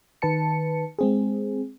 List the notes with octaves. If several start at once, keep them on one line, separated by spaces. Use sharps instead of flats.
D#3 B4 A5 C#7
G#3 C4 G#4